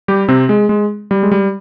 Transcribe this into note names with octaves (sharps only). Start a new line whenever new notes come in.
G3 G4
C3 C4
G#3
G#3
G3
G#3
G3